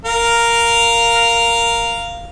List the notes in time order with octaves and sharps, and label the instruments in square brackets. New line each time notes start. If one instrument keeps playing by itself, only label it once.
[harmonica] A#4 F5